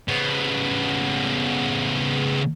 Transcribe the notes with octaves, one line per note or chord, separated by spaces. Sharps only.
C#3 B3